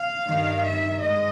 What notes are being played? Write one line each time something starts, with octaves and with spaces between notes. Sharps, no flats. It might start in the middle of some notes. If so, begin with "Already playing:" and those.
Already playing: F5
G2 D#3
E5
G#2 D#5